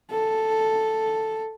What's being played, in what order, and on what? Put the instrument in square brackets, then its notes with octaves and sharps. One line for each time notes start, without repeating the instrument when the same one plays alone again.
[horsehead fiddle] A4